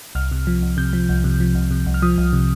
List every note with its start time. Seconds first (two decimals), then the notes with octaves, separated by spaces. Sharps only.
0.15 C2 F6
0.32 C3
0.47 F3
0.62 C2
0.77 C3 G6
0.93 F3
1.09 C2
1.24 C3
1.40 F3
1.55 C2
1.71 C3
1.86 C2
1.94 F6
2.02 F3 D#6
2.18 C2
2.33 C3